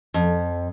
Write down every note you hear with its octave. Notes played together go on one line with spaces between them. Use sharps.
F2